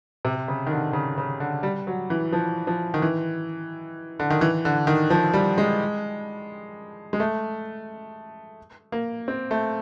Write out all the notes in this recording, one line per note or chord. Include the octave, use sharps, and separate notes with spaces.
C3
C#3
D#3
D3
C#3
C#3
D3
G3
F#3
E3
F3
F3
D#3
E3
D3
D#3
E3
D3
D#3
F3
G3
G#3
G#3
A3
A#3
C4
A3